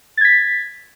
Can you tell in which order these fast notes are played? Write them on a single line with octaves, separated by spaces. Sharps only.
A6 G#6 B6